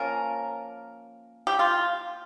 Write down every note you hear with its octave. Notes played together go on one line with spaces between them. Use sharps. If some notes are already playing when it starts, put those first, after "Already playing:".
Already playing: F3 A#3 C#4 A#4
G4
F4